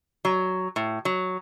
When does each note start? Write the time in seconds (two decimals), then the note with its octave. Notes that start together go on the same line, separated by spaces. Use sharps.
0.25 F#3
0.76 A2
1.05 F#3